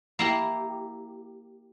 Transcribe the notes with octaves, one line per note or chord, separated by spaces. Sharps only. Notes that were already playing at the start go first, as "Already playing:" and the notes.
A#3 E4 G4